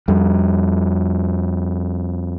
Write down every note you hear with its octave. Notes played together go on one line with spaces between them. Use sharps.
F2 G3